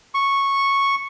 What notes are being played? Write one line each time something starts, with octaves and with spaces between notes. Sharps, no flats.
C#6